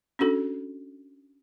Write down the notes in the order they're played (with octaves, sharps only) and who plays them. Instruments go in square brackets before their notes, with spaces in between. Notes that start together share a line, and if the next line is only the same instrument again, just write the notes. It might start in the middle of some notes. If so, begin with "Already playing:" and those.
[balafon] C#4 D4 F#4 A4